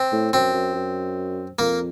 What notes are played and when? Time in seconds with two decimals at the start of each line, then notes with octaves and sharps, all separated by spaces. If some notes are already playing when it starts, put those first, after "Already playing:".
Already playing: C4
0.12 A2
0.33 F#2 C4
0.53 F#2
0.75 F#2
1.59 F2 A#3